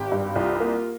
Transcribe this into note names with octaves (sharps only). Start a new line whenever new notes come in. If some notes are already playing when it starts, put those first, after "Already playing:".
Already playing: G#1 G4
G2
C2 F4
A#3